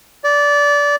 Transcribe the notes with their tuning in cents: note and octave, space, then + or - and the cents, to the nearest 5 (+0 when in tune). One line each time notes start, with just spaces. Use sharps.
D5 -20